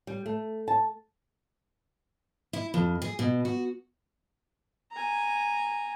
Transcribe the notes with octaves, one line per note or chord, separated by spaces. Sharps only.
G3
A3
A5
E4
F2
G#4
B2
F#4
G#5 A#5